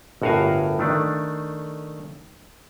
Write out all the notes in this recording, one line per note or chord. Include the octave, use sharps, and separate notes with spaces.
G1 A2 F#4 A#4 F5 G#5
D#3 A3 D4